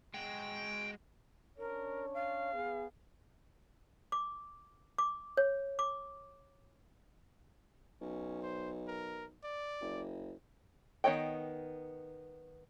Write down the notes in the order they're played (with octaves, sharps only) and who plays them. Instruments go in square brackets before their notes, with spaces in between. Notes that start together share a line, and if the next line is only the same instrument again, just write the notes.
[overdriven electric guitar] G#3 F#4 [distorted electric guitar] G5
[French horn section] C#4 D4 C#5 [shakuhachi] A#4
[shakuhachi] F5
[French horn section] B3 G#4
[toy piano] D6
D6
C#5
D6
[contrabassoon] B1 [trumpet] C#4
[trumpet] C5
A#4
D5
[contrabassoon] F#1
[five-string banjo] D#3 B3 C#5 D#5 G5